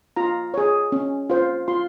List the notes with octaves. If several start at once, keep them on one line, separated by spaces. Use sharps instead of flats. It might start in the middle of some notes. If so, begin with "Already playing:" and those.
F4 A#5
G#4 C#5
C#4
F4 C5
F4 C6